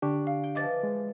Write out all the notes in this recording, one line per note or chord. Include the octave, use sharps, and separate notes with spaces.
D3 D4 G4 C#6
F5
G5
E3 F3 D#5 D6 A6
G#3